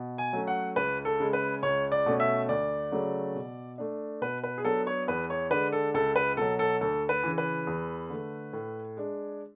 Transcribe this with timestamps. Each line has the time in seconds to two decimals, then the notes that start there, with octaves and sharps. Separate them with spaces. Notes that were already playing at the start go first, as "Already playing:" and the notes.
Already playing: B2
0.18 G#5
0.33 F#3 A3 C#4
0.47 F#5
0.76 C#2 B4
1.05 A4
1.20 C#3 G#3
1.33 B4
1.63 C#2 C#5
1.92 D5
2.06 B2 A3 C#4
2.20 E5
2.49 D2 D5
2.92 C#3 F#3 A3
3.35 B2
3.78 A3 D4
4.22 B2 B4
4.43 B4
4.58 G#4
4.64 F#3 B3 D4 A4
4.87 C#5
5.08 E2 B4
5.30 C#5
5.50 D3 G#3 D4 B4
5.72 A4
5.94 C#2 A4
6.16 B4
6.37 B2 F#3 A4
6.59 A4
6.81 D2 A4
7.09 B4
7.23 C#3 E3
7.38 B4
7.67 E2
8.10 D3 A3
8.53 A2
8.97 G#3 D4